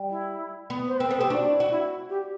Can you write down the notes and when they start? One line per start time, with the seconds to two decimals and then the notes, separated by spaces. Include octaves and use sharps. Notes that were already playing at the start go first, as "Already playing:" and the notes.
Already playing: G3
0.11 E4
0.70 B3
0.88 C5
0.98 C4 B4
1.09 B3 A4
1.20 C4 G4
1.30 D4 F#4
1.50 E4
1.60 F#4
1.70 E4
2.09 G4